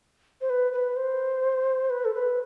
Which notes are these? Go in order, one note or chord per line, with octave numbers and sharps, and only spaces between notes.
C5
B4
B4
C5
B4
A4
B4